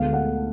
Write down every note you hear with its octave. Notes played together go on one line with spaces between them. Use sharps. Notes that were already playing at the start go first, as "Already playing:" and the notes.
Already playing: D2 D3 G#3 B3 F5
F#5